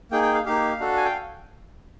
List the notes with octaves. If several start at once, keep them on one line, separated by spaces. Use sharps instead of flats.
A#3 D#4 G#4 G5
G5
F5
A#3 D#4 G4 F5
D4 F#4 A4
G#5
G5